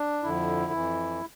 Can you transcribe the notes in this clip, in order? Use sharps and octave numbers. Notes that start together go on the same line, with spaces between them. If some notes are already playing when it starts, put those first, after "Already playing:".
Already playing: D4
F2 D3 F3 E4
F2 E3